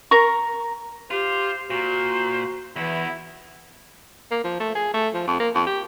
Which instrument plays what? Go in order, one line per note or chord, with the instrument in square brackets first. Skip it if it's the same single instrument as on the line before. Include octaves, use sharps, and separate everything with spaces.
[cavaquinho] A#4 A#5 C#6
[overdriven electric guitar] F4 [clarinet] G4 [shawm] C5
[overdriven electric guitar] A#2 [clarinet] F#4 [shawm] C5
[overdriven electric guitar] E2 [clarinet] E3 [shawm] E4
[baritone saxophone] A#3
F3
A3
G#4
A3
F3
F2
A#3
F2
G4